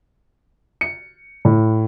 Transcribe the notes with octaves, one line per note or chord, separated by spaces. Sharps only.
C#7
A2